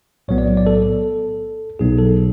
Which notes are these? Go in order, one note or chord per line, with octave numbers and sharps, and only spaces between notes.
B1 A2 F#3 B3 C#5
D5
D5
A4
B1 B2 F#3 B3 D#4 G#4
A4